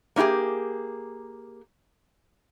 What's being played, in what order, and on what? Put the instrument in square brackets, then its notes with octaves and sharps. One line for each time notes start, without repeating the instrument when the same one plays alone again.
[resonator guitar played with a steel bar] A#3 C#4 E4 G4 G#4